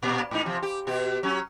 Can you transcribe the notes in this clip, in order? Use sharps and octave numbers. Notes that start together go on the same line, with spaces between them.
A#2
G#2 D#4
C3 F3
G4
B2 G4
F#3 C#4